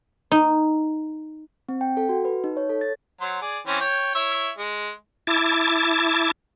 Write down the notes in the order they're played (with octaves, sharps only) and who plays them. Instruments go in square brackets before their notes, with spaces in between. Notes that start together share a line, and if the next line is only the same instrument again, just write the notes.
[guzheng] D#4
[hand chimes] C4
G5
A4
F#4
B4
D#4
C#5
A4
A6
[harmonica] F#3 C5
G#4 D5
E3 C4 C#4
C#5 G5
E4 C#5 E5
G#3
[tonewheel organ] E4 A5 D6 G#6 A6